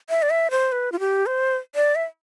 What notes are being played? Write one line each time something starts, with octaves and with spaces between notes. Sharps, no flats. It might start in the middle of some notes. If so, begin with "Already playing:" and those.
E5
D5
E5
C5
B4
F4
G4
C5
D5
E5